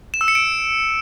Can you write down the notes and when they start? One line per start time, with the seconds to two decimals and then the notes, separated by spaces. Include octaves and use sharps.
0.14 E7
0.21 E6
0.28 C#7
0.35 D7